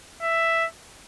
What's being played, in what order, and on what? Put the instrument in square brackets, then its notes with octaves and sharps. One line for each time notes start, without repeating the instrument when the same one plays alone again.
[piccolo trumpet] E5